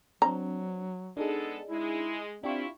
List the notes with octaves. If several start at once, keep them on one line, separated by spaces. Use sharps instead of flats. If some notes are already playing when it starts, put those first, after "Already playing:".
F#3 C4 D4 A#5
G#3 B3 D4 D#4 G#4 A4
G#3 E4
C4 D4 E4 F4 G4 C#6